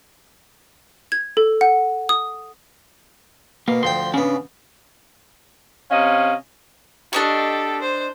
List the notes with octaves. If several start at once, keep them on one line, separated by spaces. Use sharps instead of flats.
G#6
A4
F#5
D#6
B2 A#3 F5
D2 F3 G5 C6
C#3 B3 C#4 D4
C3 C#4 D#5 F5
D4 G4 A4 D#5 C#6
C5